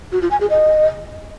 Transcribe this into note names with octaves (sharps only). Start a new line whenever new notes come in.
F#4
F4
G#5
G#4
D#5